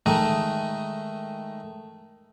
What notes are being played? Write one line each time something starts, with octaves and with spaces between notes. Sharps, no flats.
D#3 G#3 A3 D#4